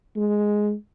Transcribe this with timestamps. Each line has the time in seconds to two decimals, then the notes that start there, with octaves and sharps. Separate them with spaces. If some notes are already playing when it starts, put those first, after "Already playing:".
0.16 G#3